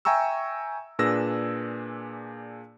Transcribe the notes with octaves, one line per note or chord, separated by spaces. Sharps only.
E5 G5 G#5 A#5 C#6 E6
A#2 D4 G#4 B4 E6 A#6